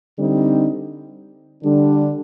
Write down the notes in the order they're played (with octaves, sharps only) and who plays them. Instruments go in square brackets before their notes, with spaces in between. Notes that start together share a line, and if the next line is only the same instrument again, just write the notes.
[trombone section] D3 G3 C4 D#4
D3 G3 D4